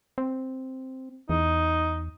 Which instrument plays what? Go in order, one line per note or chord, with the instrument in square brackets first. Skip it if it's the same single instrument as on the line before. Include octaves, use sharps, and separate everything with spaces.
[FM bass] C4
[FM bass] E2 [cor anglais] D#4